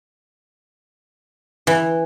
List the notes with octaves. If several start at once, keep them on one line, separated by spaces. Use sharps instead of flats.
E3